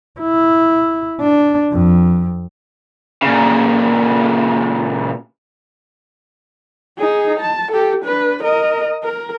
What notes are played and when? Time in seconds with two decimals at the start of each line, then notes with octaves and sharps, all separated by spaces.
0.20 E4
1.20 D4
1.72 F2
3.22 A#2 C#3
6.98 D#4 G#4
7.40 A5
7.72 G4 A4
8.05 D4 B4
8.43 A#4 D#5
9.03 A#4